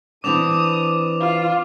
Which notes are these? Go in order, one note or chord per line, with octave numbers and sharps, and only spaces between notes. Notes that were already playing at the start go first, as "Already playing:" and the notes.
E3 C4 D4 D6 D#6 F7
F4